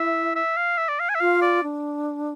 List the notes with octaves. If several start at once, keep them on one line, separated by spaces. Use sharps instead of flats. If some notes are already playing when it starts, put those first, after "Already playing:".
Already playing: E4 E5
E5
F5
E5
D5
F5
G#5
E5
F4 F5
D5
D4